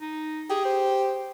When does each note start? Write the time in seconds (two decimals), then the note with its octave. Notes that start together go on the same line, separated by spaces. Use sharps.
0.01 D#4
0.50 G4 G#4
0.65 C5